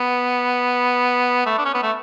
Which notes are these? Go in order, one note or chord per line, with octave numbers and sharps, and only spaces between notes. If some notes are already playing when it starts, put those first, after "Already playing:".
Already playing: B3
A3
D4
C#4
B3
A3